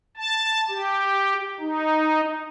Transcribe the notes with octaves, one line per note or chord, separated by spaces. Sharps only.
A5
G4
D#4